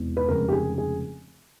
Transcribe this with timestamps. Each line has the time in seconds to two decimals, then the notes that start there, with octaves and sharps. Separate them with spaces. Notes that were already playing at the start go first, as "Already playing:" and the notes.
Already playing: E1 E2 C3
0.17 B4
0.28 F1 F2 C#3 F3 G#3 A#4
0.48 G4
0.52 G#4
0.78 G#4